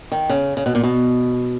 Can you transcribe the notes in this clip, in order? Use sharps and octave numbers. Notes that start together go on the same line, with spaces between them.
D#3
C#3
C#3
B2
A#2
B2